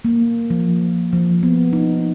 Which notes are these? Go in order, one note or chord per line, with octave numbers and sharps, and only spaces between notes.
A#3
F3
F3
B3
D#4